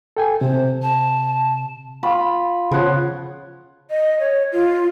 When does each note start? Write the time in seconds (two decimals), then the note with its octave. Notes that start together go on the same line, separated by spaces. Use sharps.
0.17 A4 G5 G#5
0.41 C3 C5
0.83 A5
2.03 F4 B5
2.71 C#3 F3 B3 C#5 F#5
3.90 D#5
4.20 C#5
4.52 F4